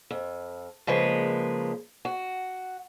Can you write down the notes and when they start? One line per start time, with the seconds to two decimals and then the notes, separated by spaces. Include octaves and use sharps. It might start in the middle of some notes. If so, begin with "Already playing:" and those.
0.10 F2
0.87 C#3 F3 G#3 A#3 B4
2.05 F#4